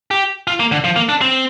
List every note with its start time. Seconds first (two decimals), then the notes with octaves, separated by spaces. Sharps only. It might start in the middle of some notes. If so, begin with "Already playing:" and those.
0.11 G4
0.47 F4
0.60 A#3
0.72 D3
0.84 F3
0.96 A#3
1.09 D4
1.21 C4